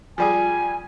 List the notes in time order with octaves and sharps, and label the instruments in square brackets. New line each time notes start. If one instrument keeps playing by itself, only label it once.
[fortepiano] F3 G3 G#4 [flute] G#5